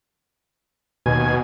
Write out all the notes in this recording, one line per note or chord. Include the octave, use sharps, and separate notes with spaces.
D#2 B2 G#5